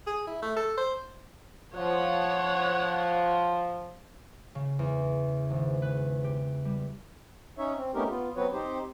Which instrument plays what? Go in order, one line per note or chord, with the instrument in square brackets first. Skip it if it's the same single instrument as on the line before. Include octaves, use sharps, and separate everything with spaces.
[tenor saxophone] G#4
E4
A3
A4
C5
[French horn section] F3 [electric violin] C#5 F#5
[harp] C#3
E2
G#1
B4
G4
G3
[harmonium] C#4 D#4 C#5 E5
C4
A3 B3 C#4 D#4 G4 A#4
B3 F4
F#3 B3 C4 F#4 B4 C#5
C4 D#4 G4 C5